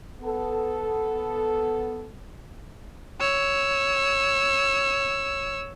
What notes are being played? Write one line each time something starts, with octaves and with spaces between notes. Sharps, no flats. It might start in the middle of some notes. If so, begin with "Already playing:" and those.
B3 A4
C#5 E6